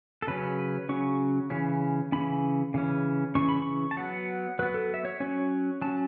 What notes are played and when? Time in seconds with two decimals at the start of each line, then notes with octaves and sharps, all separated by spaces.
0.22 A4
0.27 C#3 F#3 C#4 B4
0.89 C#3 F#3 C#4 C#6
1.50 C#3 E3 C#4
2.12 C#3 E3 C#4 B5
2.74 C#3 E3 C#4
3.35 C#3 E3 C#4 C#6
3.49 B5
3.62 C#6
3.91 A5
3.97 F#3 B3 F#5
4.59 F#3 B3 B4
4.74 A4
4.94 E5
5.05 C#5
5.20 F#3 C#4 C#5
5.82 F#3 C#4 A5